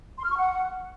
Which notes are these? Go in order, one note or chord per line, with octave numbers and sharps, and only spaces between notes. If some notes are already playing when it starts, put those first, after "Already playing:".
C6
F6
C#6
F#5